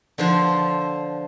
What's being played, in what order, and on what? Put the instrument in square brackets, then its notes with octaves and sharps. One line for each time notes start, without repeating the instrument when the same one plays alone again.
[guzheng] D3 F3 C5